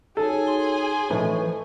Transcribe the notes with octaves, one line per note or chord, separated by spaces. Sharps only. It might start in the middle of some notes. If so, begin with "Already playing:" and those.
D#4 F#4 G#4 A4 C#5 G#5
C6
A2 E3 F3 A4 D#5 C#6